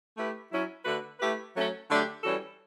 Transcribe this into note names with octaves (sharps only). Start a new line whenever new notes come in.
A3 E4 G4 B4
F#3 C#4 E4
D3 A3 D4 F#4 B4
A3 E4 G4 B4
F#3 A3 C#4
D3 F#3 A3 D4 G4
E3 G3 C#4 F#4 A4